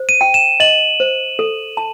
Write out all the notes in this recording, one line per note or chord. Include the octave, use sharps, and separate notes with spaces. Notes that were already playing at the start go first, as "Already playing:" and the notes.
Already playing: C5
D#7
G5
E7
D#5 F#7
C5
A4
A5